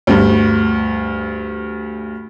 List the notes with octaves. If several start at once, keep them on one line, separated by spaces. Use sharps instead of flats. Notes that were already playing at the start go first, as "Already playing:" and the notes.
D2 G2